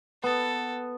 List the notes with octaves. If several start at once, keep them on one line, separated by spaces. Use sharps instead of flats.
B3 A4